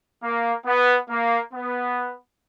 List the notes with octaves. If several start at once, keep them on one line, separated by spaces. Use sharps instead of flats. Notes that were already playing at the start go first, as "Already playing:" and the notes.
A#3
B3
A#3
B3